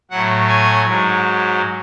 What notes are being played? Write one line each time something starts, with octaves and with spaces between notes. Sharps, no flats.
A2 F#3 F#5
G#5
G#2 F#3